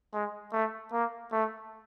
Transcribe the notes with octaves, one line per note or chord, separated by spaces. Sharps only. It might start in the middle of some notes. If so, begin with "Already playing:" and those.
G#3
A3
A#3
A3